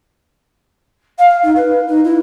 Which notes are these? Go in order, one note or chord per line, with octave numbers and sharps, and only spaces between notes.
F5
D#4
B4
D#4
E4